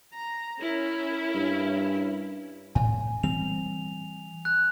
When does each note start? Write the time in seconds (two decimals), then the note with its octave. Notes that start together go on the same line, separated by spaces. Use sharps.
0.13 A#5
0.60 C#4 E4 A#4
1.34 G2
2.75 A2 G#5
3.23 E3 G3 C4 F7
4.45 F#6